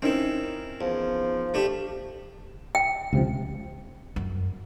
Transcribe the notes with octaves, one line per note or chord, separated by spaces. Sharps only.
C4 C#4 D#4 E4 A#4
E2 F3
A3 D4 G4
G5
C#2 C3 F3
F#2